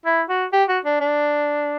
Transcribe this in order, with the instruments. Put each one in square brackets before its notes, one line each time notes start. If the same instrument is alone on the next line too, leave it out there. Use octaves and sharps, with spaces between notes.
[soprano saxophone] E4
F#4
G4
F#4
D4
D4